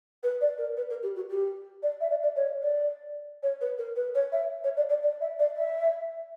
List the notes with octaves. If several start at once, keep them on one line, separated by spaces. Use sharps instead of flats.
B4
D5
A#4
B4
A#4
G4
F#4
G4
D5
E5
D5
D5
C#5
D5
C#5
B4
A#4
B4
C#5
E5
C#5
D5
D5
D5
E5
D5
E5